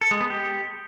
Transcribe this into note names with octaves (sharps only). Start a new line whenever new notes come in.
A4
G#3
B3
G4